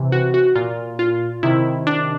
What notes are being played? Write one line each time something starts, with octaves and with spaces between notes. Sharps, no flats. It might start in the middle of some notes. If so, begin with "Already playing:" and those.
Already playing: C3 E3
F#4
F#4
A#2 F4
F4
C3 D#3 E4
D4